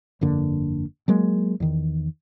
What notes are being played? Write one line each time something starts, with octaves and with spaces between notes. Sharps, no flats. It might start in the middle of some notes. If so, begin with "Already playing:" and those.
G1 F2 D3 A#3
F#3 G#3 A#3
E2 D#3